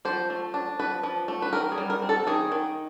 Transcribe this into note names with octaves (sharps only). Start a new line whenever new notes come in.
F3 C5
A3
D4
F3 B4
F3
A3
B4
D#3 A#4
G#4
G3
A#4
C4
A4
D#3 G#4
D#3